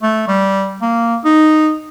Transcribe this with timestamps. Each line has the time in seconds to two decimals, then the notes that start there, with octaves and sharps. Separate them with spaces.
0.03 A3
0.28 G3
0.82 A#3
1.25 D#4